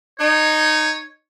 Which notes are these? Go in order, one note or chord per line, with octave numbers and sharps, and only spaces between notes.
D#4 C#5